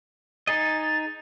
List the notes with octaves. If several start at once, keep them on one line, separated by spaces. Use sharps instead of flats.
D#4 G#4 D#5 A6